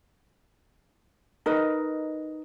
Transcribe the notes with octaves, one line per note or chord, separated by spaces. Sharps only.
D#4 A#4 B4 D#5